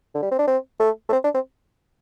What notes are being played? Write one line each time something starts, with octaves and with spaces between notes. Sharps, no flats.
D3
G3
C4
D4
C4
A3
A3
C4
D4
C4